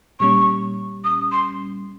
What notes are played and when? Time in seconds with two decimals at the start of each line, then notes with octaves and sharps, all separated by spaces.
0.20 A#2 G3 C#4 C#6
1.04 D#6
1.32 C6